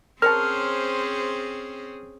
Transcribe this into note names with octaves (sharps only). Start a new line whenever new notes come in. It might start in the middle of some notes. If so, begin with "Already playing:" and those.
C4 C#4 G#4 A#4 C5 C#5 A5 F6